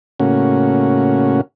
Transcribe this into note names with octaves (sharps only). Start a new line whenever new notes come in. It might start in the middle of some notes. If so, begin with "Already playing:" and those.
A2 C#3 A#3 C#4 F#4